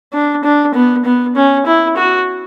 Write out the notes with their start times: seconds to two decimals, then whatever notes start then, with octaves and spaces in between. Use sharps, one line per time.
0.13 D4
0.44 D4
0.74 B3
1.05 B3
1.36 C#4
1.66 E4
1.97 F#4